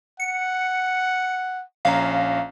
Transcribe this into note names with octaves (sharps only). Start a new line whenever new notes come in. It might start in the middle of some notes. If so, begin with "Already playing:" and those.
F#5 C#7
A#1 C#4 F5 A#5